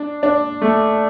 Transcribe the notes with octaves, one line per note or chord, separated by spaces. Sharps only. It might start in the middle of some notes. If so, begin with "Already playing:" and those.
Already playing: D4
D4
A3